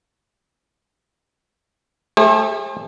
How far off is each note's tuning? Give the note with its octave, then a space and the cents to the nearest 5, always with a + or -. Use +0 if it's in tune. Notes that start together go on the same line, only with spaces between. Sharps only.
A3 -15 G#4 -45 C5 +40